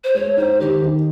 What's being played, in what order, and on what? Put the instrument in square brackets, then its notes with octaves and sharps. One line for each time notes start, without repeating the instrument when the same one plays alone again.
[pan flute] C5
[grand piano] G#3 [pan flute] C#5
[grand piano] D#4 [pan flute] C5
[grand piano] D#3 [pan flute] G4
[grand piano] D#3